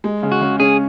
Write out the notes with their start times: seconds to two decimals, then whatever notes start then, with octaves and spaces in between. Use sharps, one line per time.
0.04 G#3
0.23 C#3
0.32 F#4
0.41 C#3
0.60 C#4 G#4